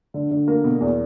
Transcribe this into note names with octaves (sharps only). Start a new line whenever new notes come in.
D3
D3
A#3
B2
E2